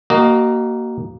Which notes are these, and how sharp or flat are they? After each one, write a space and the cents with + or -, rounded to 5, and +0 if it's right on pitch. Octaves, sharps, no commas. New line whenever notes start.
A#3 +0 F#4 +30 D#5 -10